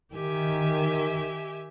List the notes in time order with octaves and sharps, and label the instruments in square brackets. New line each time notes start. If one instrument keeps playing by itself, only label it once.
[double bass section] D#3 [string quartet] G4 E5 G#5